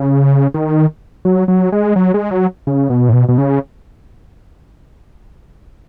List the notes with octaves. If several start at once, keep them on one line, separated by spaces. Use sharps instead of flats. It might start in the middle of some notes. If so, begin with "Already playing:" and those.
Already playing: C#3
D#3
F#3
F#3
G#3
F#3
G#3
F#3
C#3
B2
A2
B2
B2
C#3